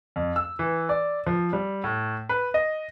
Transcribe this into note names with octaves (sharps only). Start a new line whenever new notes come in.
F2
E6
E3
D5
F3
G3
A2
B4
D#5